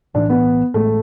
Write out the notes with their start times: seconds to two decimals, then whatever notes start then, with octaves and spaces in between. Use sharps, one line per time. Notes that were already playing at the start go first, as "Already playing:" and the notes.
0.14 B1 A2 E3 D4
0.30 B3
0.74 A1 A2 G#3 A3